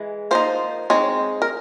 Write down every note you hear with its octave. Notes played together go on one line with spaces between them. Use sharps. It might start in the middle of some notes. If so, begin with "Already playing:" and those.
Already playing: E3 G#3
F3 A#3 D#4 C5
G#3 C4 D#4 C#5
A#4